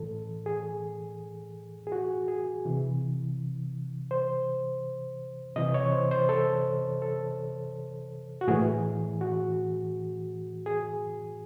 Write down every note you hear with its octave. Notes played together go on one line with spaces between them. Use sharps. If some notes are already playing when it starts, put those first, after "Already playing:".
Already playing: A2 E3 A4
G#4
G#4
F#4
G#4
C3 E3
C5
C3 E3 D#5
C#5
C5
C5
A4
A4
F#4
A2 E3 G#4
F#4
G#4